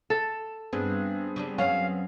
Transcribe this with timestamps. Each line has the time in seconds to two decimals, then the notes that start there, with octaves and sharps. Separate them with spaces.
0.10 A4 E7
0.73 G2 B3 C4 D4 G#4
1.36 C#3 G3 D4
1.58 F#2 F#3 C#4 F5